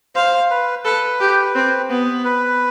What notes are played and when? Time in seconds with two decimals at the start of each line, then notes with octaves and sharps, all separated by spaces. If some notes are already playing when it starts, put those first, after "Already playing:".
0.15 C5 F5
0.51 B4
0.85 A4 B4
1.20 G4
1.55 C4
1.90 B3
2.25 B4